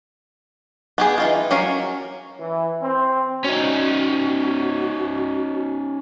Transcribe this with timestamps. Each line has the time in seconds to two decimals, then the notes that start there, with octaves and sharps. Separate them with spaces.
0.98 B3 G4 G#4
1.18 E3 D#4 F4
1.51 F#3 C#4 A#4 F5
2.40 E3
2.82 C4
3.44 C#4 D#4 F#4